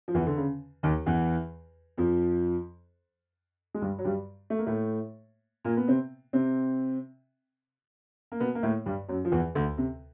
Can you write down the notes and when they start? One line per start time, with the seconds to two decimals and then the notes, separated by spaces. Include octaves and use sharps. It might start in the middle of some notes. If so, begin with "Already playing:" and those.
0.08 F3
0.14 E2 E3
0.27 D3
0.37 C#3
0.83 D#2 D#3
1.06 E2 E3
1.98 F2 F3
3.75 G#3
3.82 G2 G3
3.98 F#3
4.04 G2 G3
4.50 A3
4.59 A#3
4.66 A2 A3
5.65 A#2 A#3
5.77 B3
5.88 C3 C4
6.33 C3 C4
8.32 A#3
8.40 B2 B3
8.55 A#3
8.63 A2 A3
8.86 G2 G3
9.08 F#2 F#3
9.25 F3
9.32 E2 E3
9.55 D2 D3
9.78 C3